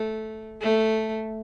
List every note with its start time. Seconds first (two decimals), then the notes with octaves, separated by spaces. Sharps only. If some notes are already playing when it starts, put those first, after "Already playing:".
Already playing: A3
0.61 A3